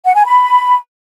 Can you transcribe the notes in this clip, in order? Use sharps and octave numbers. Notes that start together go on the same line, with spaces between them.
F#5
G#5
B5